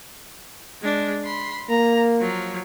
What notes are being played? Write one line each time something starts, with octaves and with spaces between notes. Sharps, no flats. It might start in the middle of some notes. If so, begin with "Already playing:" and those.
G#3 D4
B5 C6
A#3 A#5
F3 F#3